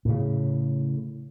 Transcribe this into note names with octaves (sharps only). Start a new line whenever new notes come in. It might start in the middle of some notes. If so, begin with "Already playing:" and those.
A2 C#3